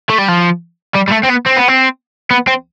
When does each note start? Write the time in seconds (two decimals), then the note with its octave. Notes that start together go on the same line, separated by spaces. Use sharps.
0.10 A3
0.18 G3
0.29 F3
0.95 G3
1.09 G3
1.12 A3
1.25 C4
1.30 B3
1.46 C4
1.57 B3
1.68 C4
2.31 B3
2.47 C4